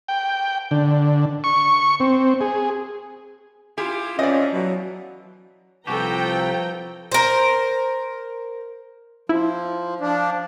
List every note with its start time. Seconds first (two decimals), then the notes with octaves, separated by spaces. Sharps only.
0.08 G5
0.71 D3
1.44 C#6
2.00 C4
2.41 G#4
3.78 E4 F4 G4 G#4
4.19 F2 E3 F3 C#4 D5 D#5
4.54 B2 E3 F#3
5.87 C2 F3 F#4 G4 A4 B4 G5 A#5
7.12 A#4 C5
9.29 F3 E4
10.01 F3 D4